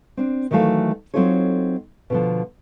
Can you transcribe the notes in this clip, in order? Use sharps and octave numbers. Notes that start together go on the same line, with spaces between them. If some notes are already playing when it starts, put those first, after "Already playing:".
C4 D4
D#3 E3 F#3 A3 F5
F#3 C4 D#4 F4 A4 C#5
B2 D3 F3